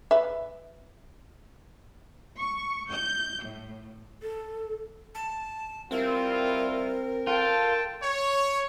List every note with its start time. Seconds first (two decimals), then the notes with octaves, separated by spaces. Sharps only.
0.11 B4 E5
2.37 C#6
2.91 G6
3.44 A2
4.22 A4
5.15 A5
5.91 G3 C4 E4 F4 A#4
7.27 F4 A4 G5 A5
8.03 C#5